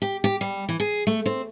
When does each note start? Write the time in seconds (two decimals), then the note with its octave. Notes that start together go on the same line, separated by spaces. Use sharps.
0.02 G4
0.24 G4
0.41 G3
0.69 E3
0.80 G#4
1.07 A3
1.26 C4